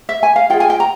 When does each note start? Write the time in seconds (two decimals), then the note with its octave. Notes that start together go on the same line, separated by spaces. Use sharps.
0.09 E5
0.23 G#5
0.36 F5
0.50 F4 G5
0.53 G#4
0.60 G#5
0.70 G5
0.80 A#5